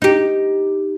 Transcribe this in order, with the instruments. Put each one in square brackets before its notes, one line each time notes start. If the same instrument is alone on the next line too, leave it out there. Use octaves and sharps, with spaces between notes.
[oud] D#4 G4